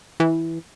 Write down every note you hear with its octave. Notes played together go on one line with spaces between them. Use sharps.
E3